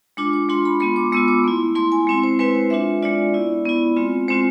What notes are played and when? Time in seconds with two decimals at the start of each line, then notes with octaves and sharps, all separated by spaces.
0.17 G#3 D4 F4 D6
0.33 D6
0.49 G#3 D4 F4 C6
0.65 B5
0.80 G#3 B3 F4 C6
0.96 D6
1.12 G#3 B3 F4 E6
1.28 D6
1.44 A3 E4
1.75 A3 E4 C6
1.92 G#5
2.07 G#3 C4 E4
2.23 C5
2.39 G#3 C4 E4 B4
2.55 C5
2.70 G#3 D4 F4 E5
3.02 G#3 D4 F4 D5
3.33 B3 E4
3.65 B3 E4
3.96 G#3 C4 F4
4.28 G#3 C4 F4 C5